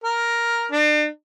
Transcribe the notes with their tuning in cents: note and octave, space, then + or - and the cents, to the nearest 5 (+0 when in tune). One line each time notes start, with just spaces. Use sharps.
A#4 +5
D4 +40